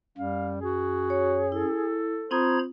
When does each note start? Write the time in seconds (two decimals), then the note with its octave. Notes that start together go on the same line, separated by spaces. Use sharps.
0.18 F#2 G3 F5
0.61 F#4 G#4
1.10 C#5
1.52 E4 A4
2.31 C4 F4 C5 A#5 B5 D#6 G#6